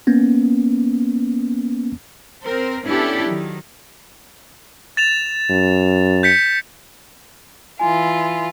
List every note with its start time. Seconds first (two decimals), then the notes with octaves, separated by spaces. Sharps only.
0.07 A#3 B3 C#4
2.44 C4 A#4 C5
2.85 B3 C#4 D4 E4 G4 A4
3.26 D#3 F#3
4.97 A6 E7 F7
5.50 F#2
6.23 G6 B6 C#7
7.79 E3 F4 G#5